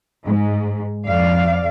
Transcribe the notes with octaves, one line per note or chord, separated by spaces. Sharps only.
G#2
F2 D5 F5